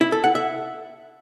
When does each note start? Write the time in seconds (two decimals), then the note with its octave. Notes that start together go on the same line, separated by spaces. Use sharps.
0.01 E4
0.12 A4
0.24 F#5
0.35 E5